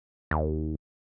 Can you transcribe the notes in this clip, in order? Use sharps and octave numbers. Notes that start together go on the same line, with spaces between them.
D#2